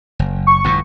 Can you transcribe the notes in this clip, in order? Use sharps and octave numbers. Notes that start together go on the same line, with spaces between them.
F#1
C#6
G1 F2 A2